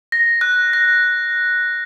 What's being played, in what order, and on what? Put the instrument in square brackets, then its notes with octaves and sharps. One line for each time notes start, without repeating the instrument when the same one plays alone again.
[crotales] A#6
F#6
A#6